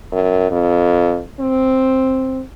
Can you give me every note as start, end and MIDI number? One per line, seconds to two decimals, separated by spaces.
0.12 0.49 42
0.51 1.21 41
1.40 2.42 60